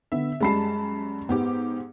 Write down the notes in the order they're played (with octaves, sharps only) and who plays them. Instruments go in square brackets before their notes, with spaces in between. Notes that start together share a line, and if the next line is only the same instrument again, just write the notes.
[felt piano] D3 B3 [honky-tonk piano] E5
[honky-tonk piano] F#2 G3 A5 [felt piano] G#3 B5 C7
[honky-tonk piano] G#2 G4 D6 [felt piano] B3